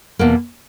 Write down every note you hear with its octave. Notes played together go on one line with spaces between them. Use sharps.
E2 B2 A#3